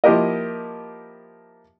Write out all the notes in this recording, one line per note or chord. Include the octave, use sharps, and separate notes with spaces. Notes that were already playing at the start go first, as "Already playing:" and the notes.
F3 A#3 E4 G4 A#4 D#5